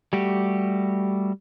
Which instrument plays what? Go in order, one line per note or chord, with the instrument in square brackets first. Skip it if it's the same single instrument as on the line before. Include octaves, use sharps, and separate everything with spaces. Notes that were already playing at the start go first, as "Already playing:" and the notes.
[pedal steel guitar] G3 A3 F#4 G4